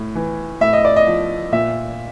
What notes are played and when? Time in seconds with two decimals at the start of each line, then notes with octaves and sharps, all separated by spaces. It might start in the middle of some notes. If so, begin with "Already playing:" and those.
Already playing: A2
0.15 E3
0.61 A2 E5
0.73 D#5
0.85 D5
0.96 D#5
1.06 F3
1.52 A#2 E5